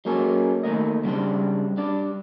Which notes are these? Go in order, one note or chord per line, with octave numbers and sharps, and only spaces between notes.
F#3 G#3 A#3 C#4 A4
D#3 A3 A#3 D#5
C#3 G3 G#3 C4 D4
G3 D4 D5